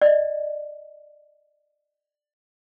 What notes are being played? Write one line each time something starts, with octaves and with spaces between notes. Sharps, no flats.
D5 D#5